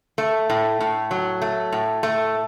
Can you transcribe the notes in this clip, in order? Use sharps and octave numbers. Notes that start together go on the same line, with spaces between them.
A3
A2
A2
F#3
A3
A2
A3